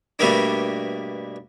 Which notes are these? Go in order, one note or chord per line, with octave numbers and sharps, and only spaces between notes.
G2 B2 G3 A3 A#3 D4